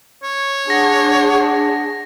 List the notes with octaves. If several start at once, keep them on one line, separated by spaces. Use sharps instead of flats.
C#5
D4 G#4 F#5 A#6